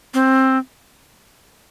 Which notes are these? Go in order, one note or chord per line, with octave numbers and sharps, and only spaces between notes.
C4